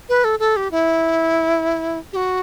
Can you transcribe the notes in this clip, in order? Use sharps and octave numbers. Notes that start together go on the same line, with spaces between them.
B4
A4
A4
G4
E4
G4
F#4